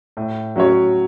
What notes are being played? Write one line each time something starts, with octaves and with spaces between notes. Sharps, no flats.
A2
F#3 C#4 F#4 C#5